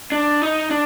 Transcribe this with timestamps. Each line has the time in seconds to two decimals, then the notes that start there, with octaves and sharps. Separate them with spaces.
0.12 D4
0.41 D#4
0.71 D4